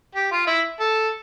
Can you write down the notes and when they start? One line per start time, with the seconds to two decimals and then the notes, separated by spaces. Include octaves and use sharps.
0.15 G4
0.32 F4
0.47 E4
0.80 A4